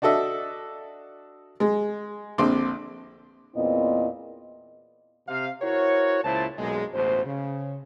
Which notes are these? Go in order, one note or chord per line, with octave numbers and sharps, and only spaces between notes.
D4 F#4 A4 D#5 E5
G#3
A#1 D3 C4 C6 D6
E2 A#2 B3 C4 E4 D#5
C3 F5
E4 F#4 A#4 C5 C#5
C#2 A#2 E4 C5 A5
B1 F#2 A#2 G#3
A1 D2 B2 C5
C#3